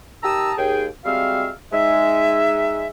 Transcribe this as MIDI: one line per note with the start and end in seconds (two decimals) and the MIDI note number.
0.24 0.53 51
0.24 0.53 67
0.24 0.53 81
0.24 0.53 82
0.24 0.53 87
0.24 0.53 88
0.58 0.87 39
0.58 0.87 68
0.58 0.87 79
1.05 1.50 55
1.05 1.50 56
1.05 1.50 60
1.05 1.50 66
1.05 1.50 76
1.05 1.50 77
1.73 2.89 56
1.73 2.89 63
1.73 2.89 76